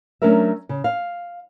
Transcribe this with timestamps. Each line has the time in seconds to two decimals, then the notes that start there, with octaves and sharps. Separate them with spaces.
0.22 F#3 A3 C#4 D4 A#4 E5
0.69 C#3
0.84 F5